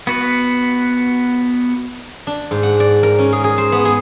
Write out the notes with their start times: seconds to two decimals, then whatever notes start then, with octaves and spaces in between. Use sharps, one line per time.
0.07 B3 F#4 B4
2.27 D4
2.51 G#2
2.63 F#5
2.80 D5
3.03 A#4
3.19 C#4
3.33 G#4
3.44 G#4
3.58 C5
3.72 B3
3.85 G#4